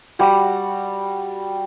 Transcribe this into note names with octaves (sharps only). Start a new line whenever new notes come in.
G3 F#4 F#5